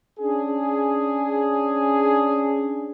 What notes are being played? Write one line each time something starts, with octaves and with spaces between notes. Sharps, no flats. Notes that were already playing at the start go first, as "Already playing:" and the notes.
C#4 D4 G#4